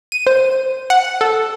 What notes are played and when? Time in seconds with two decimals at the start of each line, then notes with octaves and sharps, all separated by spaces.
0.12 D#7
0.27 C5
0.90 F#5
1.21 A4